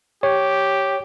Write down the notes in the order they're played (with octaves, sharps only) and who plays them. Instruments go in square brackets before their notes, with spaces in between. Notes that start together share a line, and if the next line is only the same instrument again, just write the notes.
[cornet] G4 [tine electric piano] C#5